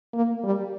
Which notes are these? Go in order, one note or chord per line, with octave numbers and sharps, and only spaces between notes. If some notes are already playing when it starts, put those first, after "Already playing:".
A#3
G3